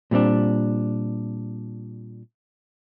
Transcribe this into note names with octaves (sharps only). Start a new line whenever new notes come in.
A#2 G3 C4 D4